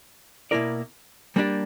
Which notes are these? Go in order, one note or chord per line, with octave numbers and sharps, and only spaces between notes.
B2 A#3 E4 A#4 D5
G3 A#3 D4 G4